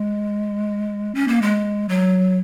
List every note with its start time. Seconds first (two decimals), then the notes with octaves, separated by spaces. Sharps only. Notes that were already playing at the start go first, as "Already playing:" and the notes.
Already playing: G#3
1.15 C#4
1.28 A#3
1.42 G#3
1.89 F#3